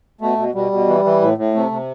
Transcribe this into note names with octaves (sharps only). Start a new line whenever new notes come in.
B2 A3
B2
B2 G3
B2
E3
E3
A2
A2
C3 A3
C3